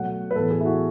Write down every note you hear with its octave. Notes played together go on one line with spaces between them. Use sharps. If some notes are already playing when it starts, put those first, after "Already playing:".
Already playing: B2 F#3 A3 F#5
B4
A2 E3 B3 A4
G#4
E4
F#4